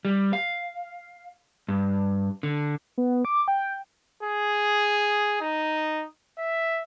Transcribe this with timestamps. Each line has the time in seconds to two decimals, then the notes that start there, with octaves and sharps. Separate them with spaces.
0.05 G3
0.33 F5
1.68 G2
2.43 D3
2.98 B3
3.25 D6
3.48 G5
4.23 G#4
5.41 D#4
6.38 E5